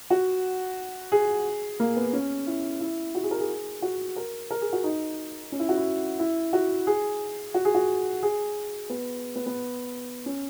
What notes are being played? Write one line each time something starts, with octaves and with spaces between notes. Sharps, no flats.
F#4
G#4
A#3
B3
C#4
E4
E4
F#4
G#4
A#4
G#4
F#4
A#4
A#4
G#4
F#4
D#4
C#4
E4
F#4
E4
E4
F#4
G#4
F#4
G#4
F#4
G#4
B3
B3
B3
C#4